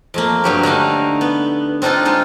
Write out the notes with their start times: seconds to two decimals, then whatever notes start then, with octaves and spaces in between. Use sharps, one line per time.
0.14 F2 A3 A#3
0.44 G2 F#3 G4
0.63 D3 A3 D#4 F5
1.21 B3
1.82 C4 D4 D#4 F4 A4
2.05 G#3 D#4 F4